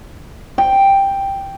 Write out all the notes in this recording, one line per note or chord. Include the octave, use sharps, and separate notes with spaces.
G5